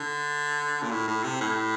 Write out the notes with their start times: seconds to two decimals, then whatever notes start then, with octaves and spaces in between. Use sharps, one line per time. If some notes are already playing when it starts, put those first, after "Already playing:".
Already playing: D3
0.83 A#2
0.91 A2
1.08 A2
1.24 C3
1.41 A2